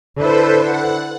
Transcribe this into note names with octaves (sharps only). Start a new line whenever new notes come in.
D3 E4 A4 B4 C5
F#5